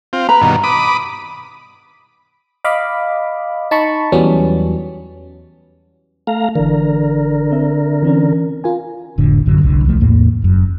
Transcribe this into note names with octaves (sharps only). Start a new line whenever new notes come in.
C4 F4
B4 A#5
G2 B2 D#3
B5 D6 D#6
D#5 F5 B5 D6
D#4 A5 B5 C#6
E2 F#3 G3 B3 C#4
A3 F5 A#5
G1 D3 E3 A#4
C4 E5
E3 C4 C#4
F4 A#4 G#5
F1 A2 D3
A1 F#2 D3 F#3
F1 C2 D3
D1 C2 F3 A3
E2 A2 A#3
F#1 F#2